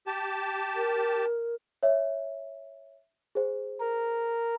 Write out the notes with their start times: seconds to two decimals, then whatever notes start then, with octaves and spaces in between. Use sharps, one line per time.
0.07 G4 A5
0.76 A#4
1.83 C#5 E5
3.35 G#4 C5
3.80 A#4